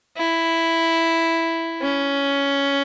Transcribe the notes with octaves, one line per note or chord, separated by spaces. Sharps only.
E4
C#4